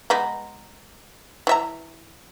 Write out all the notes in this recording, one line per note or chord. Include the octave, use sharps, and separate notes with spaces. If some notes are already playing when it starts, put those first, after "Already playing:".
G#3 B3 D#4
E3 E5 A#5